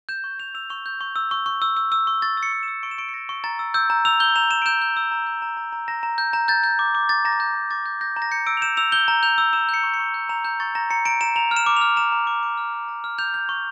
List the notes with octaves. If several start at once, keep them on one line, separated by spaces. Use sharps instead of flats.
G6 E7
C#6
G6 F7
E6 F7
C#6 F7
G6
C#6
E6
C#6
C#6
E6
E6
E6
C#6
C#6 A6
E6
C#7
C#6
E6 E7
C#6 D7
E7
C#6 D7
C#7
C#6 A#6
C#6
A#5 A6
E6
E6 G6
A#5
E6 F7
G6 G7
A#5 F7
A#5 E7
D7
G6 E7
G6
E6
A#5
G6
A#5
A#5
A#5
A#5 A#6
A#5
G6
A#5
G6 A6
G6
D6
D6
D6 A6
A#5 A#6
A6
A#5 G6
A#5
D6 A6
G6
G6 A#6
A#5
A#6
G6 C#7
E6 D7
F7
G6 E7
E6 F7
G6 G7
A#5
G6 F7
E6
E6 E7
G6 C#7
C#6
C#7
C#6
G6
A#5 F7
A#5 G6
C#6 A6
A#5 A#6
A#5 C#7
A#5 D7
A#5 E7
A#5 F7
F6
E7
D6
F6 F7
A#5 E7
A#5
D6
D6
F6
F6
A#5
F6
G6 F7
G6
C#6